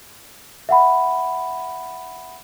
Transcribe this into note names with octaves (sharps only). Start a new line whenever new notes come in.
E5 F#5 B5